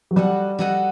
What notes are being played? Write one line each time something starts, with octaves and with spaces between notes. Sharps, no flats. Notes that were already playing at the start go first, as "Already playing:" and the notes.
F#3
G3 F#4 A4 D#5 F#5
G3 F#4 A4 D#5 F#5